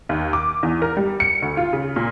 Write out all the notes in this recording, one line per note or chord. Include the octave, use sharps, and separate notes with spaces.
D#2
D6
E2
A#4
G3
C#7
D2
F4
C#3
A#2